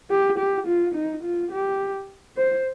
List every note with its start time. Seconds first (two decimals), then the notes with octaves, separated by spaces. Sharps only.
0.10 G4
0.39 G4
0.67 F4
0.95 D#4
1.24 F4
1.52 G4
2.37 C5